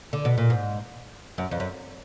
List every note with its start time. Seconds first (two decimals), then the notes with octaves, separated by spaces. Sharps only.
0.13 D3
0.25 B2
0.38 A#2
0.50 G#2
1.38 F#2
1.51 F2
1.60 F#2